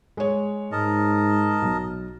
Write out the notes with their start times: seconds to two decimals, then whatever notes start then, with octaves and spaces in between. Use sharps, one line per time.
0.17 G#3 C#5
0.72 G#2 A#4 D#5 A5
1.62 B1